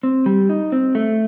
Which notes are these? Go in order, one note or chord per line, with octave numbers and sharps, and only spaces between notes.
C4
G3
D#4
C4
A3